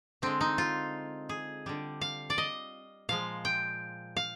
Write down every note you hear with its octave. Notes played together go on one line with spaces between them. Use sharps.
D3 G#3 C4
D#4
F4
G#4
D3 G3
F5
D5
D#5
A#2 F3 G#3 F5
G5
F5